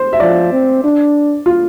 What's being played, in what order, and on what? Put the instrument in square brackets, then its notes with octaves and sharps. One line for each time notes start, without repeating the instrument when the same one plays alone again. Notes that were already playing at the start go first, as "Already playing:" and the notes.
Already playing: [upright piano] C5
E5
[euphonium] F3 [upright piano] D5
[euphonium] C4
D4
[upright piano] F4